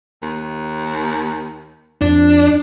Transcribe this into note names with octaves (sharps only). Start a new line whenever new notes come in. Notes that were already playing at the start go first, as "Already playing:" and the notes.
D#2
F2 D4